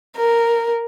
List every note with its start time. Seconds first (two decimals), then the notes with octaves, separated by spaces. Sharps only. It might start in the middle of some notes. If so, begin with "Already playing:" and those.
0.16 A#4